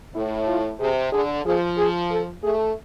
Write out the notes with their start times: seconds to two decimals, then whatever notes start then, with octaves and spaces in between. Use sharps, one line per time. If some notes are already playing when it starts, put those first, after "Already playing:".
0.15 A2 E4
0.48 F4
0.80 C3 G#4
1.12 D3 G#4
1.46 F3 G#4
1.78 G#4
2.11 A4
2.43 A3 G#4